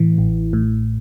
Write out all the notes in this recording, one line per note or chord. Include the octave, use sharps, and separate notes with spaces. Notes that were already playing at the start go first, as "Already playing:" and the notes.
Already playing: A2 E3
A1
A2